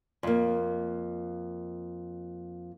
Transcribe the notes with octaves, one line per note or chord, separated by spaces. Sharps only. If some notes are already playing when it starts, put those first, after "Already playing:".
F2 A#3